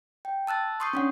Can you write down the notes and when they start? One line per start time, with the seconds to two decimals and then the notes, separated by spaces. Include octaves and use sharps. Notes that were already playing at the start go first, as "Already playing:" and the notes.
0.25 G5
0.47 A5 E6 F#6 A6
0.80 C6 C#6 D#6 G6 C7
0.93 C#4 D4 F#5